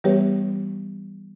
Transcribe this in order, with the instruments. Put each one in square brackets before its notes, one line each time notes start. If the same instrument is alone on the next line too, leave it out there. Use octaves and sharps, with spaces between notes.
[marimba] E3 G3 B3 G4 B4 C#5